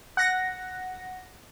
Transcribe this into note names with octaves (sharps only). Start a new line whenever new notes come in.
F#5 A#6